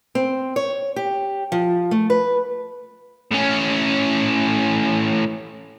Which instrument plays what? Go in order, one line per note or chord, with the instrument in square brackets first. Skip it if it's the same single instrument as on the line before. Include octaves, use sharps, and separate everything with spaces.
[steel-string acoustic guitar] C4
C#5
G4
F3
A3
B4
[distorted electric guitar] A2 C#4